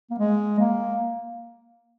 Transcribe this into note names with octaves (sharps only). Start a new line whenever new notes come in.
A#3
G#3
A#3